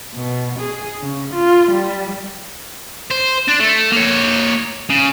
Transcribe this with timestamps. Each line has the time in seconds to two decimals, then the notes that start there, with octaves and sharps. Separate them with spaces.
0.14 B2
0.59 G#4
1.01 C#3
1.34 F4
1.71 G3
3.10 C5
3.48 D4
3.60 A3
3.92 A#3 C#5
4.90 C#3